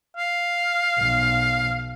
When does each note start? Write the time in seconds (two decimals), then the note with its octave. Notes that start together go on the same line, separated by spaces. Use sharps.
0.17 F5
0.98 B1